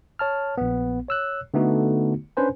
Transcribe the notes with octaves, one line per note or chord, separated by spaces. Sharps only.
C#5 A5 F6
A#1 B3
C#5 E6 F#6
D3 A3 B3 D#4 F#4
C#4 D4 B4 C5 G#5